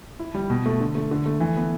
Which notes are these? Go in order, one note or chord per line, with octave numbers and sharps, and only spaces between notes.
E4
G3
B2
A3
D3
A3
D3
A3
E3
B3